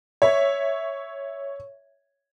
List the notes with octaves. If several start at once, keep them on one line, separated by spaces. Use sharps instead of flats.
C#5 E5